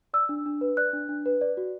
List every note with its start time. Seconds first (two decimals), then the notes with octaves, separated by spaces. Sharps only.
0.14 D5 E6
0.29 D4
0.46 D4
0.61 B4
0.77 D5 F#6
0.93 D4
1.09 D4
1.26 B4
1.41 D5
1.57 F#4